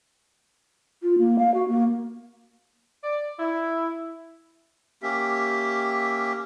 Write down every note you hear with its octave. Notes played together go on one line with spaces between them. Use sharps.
F4
A#3
F5
F#4
A#3
D5
E4
A#3 C#4 G4 E5